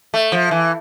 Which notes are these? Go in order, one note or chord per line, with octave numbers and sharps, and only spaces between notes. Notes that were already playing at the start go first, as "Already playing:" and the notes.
A3
F3
E3